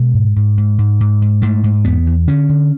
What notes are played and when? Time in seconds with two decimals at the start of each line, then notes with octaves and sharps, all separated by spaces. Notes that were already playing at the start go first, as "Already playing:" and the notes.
Already playing: B2 G#3
0.14 G#2
0.36 G#2
0.57 G#2
0.78 G#2
1.00 G#2
1.22 G#2
1.42 G#2 A3
1.64 G#2
1.85 E2 B3
2.06 E2
2.27 D3 C#4
2.49 D3